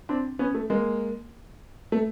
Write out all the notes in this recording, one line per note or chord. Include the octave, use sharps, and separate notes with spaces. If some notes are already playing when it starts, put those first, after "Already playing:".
C4 D4
B3 C#4
A3
G#3 A#3
A3